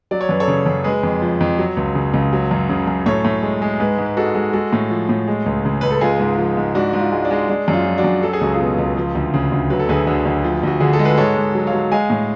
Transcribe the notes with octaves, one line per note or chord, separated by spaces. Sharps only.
F#3 D5
C#5
F#2 B4
A4 C#5
C#3
F#2
G#3 G#4 B4
F2
F3
F2
F#3
C#2
C#3
C#2
F#3
F#2
C#3
F#2
A2 A4 C#5
A2
G#3
G#3
G#2 G#4 B4
G#2
B4
G#3 F#4 A4
G#3
G#3 F#4 A4
A2
F3
A2
G#3
C#2
C#3
C#2 B4
A4
G#3 F4 G#4
G#2
F3
G#2
G#2 D4 F#4
G#2
F4
G#3
D4
G#3
G#3 D4
F#2
F4
F3
D4 F#4
F#2
F#3 A4
G#4
C#2 F#4
F4 G#4
B2
C#2
F3
D2
C#3
D2
F#3 B4
A4
D2 G#4 B4
D3
D2
F3
D2 F#4
D3 G#4
A4
G#3
B4
G#2 A4 C#5
G#2
F#3
C#5 F5
F#3
G#3 F5 G#5
A2